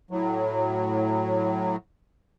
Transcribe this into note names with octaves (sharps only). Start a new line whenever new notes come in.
A2 F#3